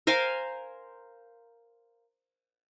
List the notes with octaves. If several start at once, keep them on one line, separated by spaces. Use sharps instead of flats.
A#4 C5 F5 G#5